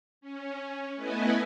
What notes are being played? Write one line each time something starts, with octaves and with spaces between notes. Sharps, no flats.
C#4
A3 B3 E4 B4 D#5 G#5